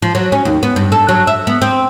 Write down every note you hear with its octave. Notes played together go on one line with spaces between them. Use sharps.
F3
F#3
C#4
D#2
B3
G2
A4
F#3
E5
B3
C4